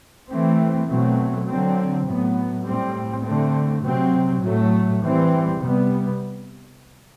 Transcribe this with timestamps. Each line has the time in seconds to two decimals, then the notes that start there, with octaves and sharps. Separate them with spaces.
0.29 E3 A3 C4
0.88 B2 F#3 A3 C4
1.47 D3 F#3 C4
2.06 A2 F#3 B3
2.65 A2 G3 C4
3.24 D3 A3 C4
3.84 C3 F#3 C4
4.42 A2 F#3 A3
5.02 E3 G3 C4
5.61 C3 G3 B3